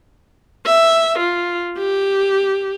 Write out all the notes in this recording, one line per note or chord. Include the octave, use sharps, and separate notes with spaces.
E5
F4
G4